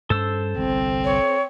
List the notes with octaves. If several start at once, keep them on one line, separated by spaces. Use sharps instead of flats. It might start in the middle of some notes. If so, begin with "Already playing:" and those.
G2 C#4 A4 C5 E6
G1 C2 C4
C#5